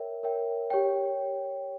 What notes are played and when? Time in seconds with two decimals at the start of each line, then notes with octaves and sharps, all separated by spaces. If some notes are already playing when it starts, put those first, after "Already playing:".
Already playing: A#4 C#5 E5 G5
0.23 A#4 C#5 E5 G5
0.70 G4 C#5 G5